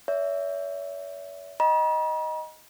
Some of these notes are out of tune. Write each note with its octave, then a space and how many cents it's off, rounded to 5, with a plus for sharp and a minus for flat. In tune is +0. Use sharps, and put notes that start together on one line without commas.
C#5 +40 E5 +0
D#5 +0 G5 -40 A#5 +45